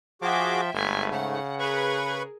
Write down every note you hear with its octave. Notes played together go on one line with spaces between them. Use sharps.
F3 F#4 G#4 E5 G5 D6
G1 G#2 A3 B4 G#5
C#3 F#5
G#4 A#4 B4 B5 C#6